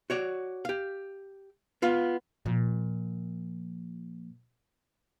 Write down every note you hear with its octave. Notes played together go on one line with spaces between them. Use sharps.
F#4 C#5 D5
G4 F5
B3 F4 F5
A#2 F3